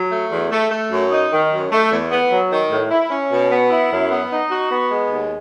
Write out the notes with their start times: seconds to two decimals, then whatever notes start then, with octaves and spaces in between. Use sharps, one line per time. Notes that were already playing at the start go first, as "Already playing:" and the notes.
Already playing: F#3
0.10 A3
0.31 E2
0.51 A3
0.70 A3
0.90 F#2
1.10 D#4
1.31 D#3
1.51 F#2
1.71 A3
1.91 E2
2.11 B3
2.30 F#3
2.51 D#3
2.70 A2
2.90 E4
3.10 C#4
3.30 B2
3.50 B3
3.70 E4
3.90 F#2
4.10 B3
4.31 D#4
4.50 F#4
4.70 B3
4.90 G#3
5.10 D#2